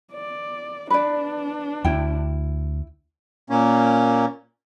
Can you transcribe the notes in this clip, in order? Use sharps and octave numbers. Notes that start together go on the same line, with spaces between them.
D5
D4 B4 D5
D2 E4 G5
A#2 A#3 C#4